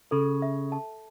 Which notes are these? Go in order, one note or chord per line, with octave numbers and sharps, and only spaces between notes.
C#3 A4
E5
A5